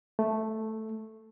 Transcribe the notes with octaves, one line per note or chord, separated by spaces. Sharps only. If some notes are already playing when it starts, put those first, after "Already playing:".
A3